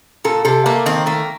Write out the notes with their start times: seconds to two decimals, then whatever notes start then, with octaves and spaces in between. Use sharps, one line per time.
0.25 A#2 A4
0.45 C3 A4
0.66 A3 A#3
0.86 D#3 C4
1.06 A3 A#3